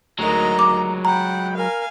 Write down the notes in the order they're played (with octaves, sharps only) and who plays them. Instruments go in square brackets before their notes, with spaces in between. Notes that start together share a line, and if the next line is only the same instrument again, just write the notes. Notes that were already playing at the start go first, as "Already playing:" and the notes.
[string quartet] D2 D#3 D#5 [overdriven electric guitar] F#3 G#3 [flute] A#5
[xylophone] D6
[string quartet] F#5 B5 [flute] G5 [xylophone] A#5
[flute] A#4 [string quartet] F5 G#5